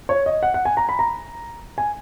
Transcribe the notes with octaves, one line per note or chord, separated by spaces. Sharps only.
C#5
D#5
F#5
F#5
G#5
A#5
B5
A#5
G#5